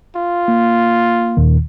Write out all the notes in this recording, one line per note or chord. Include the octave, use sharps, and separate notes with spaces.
F4
A#3
D#2 A#2 D#3